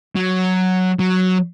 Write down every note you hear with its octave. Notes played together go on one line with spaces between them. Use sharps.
F#3
F#3